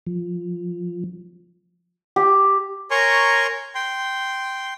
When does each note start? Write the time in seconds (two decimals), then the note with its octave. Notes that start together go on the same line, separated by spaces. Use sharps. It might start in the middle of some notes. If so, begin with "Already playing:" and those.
0.07 F3
2.16 G4
2.91 A#4 C#5 G#5 A#5 C6 C#6
3.75 G5 C6